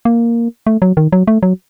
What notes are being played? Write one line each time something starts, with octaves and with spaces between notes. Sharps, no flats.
A#3
A3
F#3
D#3
F#3
A3
F#3